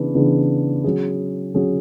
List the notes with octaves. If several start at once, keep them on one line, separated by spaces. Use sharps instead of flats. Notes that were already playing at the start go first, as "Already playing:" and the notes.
Already playing: C#3 E3 B3 D4 G#4
C#3 E3 B3 D4 G#4
F#3 C#4 G#4
F#3 C#4 G#4